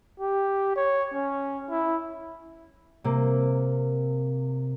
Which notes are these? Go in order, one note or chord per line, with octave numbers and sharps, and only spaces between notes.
G4
C#5
C#4
E4
C3 A#3